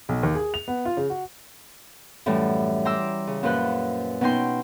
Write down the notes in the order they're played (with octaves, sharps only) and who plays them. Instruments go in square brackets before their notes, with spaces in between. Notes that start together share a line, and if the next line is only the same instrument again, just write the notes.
[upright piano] B1
D#2
G#4
F7
B3
F4
C#3
F#4
[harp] F#2 A2 E3 G3
G5 A#5 C6 D6 E6
C#3
F#2 A#2 F4 B4 C5 F#6
B2 C#4 D#4 G5 C6